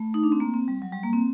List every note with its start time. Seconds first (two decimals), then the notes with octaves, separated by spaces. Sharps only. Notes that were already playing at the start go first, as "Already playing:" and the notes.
Already playing: A3
0.14 D#4
0.23 D4
0.32 C4
0.40 A#3
0.54 C4
0.68 G3
0.82 F#3
0.92 G3
1.03 A#3
1.13 C4